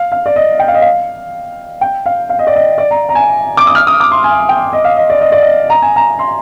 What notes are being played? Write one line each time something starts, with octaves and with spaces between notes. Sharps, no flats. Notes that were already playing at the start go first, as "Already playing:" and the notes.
Already playing: F5
F5
D5
D#5
G5
F5
D#5
F5
G5
F5
F5
D#5
D5
D#5
D5
A#5
A#5
G#5
D6
D#6
F6
D#6
D6
C6
G#5
G5
D#5
F5
D#5
D5
D#5
D5
D#5
A#5
G#5
A#5
C6